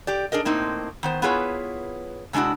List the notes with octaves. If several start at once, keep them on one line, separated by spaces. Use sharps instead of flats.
G4 D5
D4 G#4 A#4 D#5
A2 A#3 C4 D#4
D#3 B3 C5
B3 E4 F4 G#4 B4 C#5
C3 G#3 D4 E4 F#4